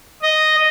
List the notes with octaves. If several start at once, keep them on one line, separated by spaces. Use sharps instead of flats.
D#5